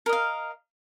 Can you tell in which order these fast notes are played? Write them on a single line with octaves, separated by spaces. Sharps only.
A#4 D#5 F5